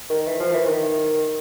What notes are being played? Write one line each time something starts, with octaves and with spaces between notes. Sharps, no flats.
D#3
E3
F3
E3
D#3